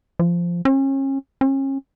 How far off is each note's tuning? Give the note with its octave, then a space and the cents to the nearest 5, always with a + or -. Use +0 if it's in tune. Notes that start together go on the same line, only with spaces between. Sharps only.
F3 -10
C#4 -35
C#4 -35